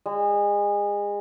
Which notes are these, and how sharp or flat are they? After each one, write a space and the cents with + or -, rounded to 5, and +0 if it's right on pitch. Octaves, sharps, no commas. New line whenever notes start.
G#3 -30